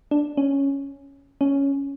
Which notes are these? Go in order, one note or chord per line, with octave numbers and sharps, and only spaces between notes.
D4
C#4
C#4